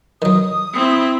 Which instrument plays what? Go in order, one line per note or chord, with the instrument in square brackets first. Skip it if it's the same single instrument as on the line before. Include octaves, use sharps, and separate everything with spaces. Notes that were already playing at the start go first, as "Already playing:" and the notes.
[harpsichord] D#3 F#3 [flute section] D#6
[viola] C4 E4